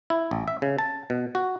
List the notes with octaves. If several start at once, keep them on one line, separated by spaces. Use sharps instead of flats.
E4
A1
E5
C#3
A5
B2
F#4